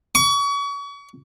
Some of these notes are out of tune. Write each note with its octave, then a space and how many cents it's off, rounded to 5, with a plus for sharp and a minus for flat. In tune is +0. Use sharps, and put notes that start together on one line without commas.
C#6 +35